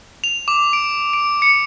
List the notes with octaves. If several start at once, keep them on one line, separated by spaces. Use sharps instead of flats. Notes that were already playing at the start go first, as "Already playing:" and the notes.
F7
D6
D7
D7
C#7